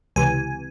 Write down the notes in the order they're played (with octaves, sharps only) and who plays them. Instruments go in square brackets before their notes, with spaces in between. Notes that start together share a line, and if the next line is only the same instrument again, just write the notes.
[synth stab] C#2 C3 E3 G#5